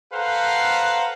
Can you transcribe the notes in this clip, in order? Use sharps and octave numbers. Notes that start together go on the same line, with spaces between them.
A4 B4 C5 F5 F#5 A#5